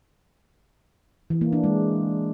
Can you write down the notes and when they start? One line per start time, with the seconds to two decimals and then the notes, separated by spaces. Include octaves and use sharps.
1.30 E3
1.41 A#3
1.52 D4
1.64 G#3